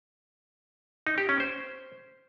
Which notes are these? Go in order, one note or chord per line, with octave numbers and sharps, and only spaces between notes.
D#4
G4
C#4
C5